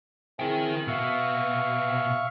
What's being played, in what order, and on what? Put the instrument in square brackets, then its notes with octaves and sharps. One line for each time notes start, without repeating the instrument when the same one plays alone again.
[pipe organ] C4 E4 G#4 [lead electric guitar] A#4 G5
[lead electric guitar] B2 [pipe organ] E5 F5 C#6